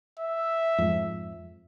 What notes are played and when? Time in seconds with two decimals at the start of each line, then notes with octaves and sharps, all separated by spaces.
0.19 E5
0.78 F2 G#2